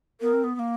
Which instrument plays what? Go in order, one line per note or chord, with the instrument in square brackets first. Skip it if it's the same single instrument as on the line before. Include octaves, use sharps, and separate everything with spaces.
[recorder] B3 [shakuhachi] A#4
[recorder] C4
B3
B3
A#3